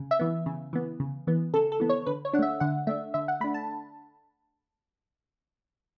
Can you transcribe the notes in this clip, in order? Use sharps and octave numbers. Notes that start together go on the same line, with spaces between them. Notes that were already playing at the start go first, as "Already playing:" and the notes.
Already playing: C#3
E5
E3 B3
C#3
E3 B3
C#3
E3 B3
C#3 A4
A4
E3 B3
C#5
D3 B4
C#5
D4 F#5
A3 E5
D3 F#5
A3 D4 E5
D3 E5
F#5
A3 D4 B5
A5